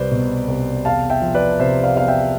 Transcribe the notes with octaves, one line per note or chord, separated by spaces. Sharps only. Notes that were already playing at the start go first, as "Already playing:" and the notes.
Already playing: C2 G3 B4 C5 D5
B2
C2
E2 F5 A5
E5 G5
F3
B4 D5
C3 C5 E5
D5 F5
E2 F5
E5 G5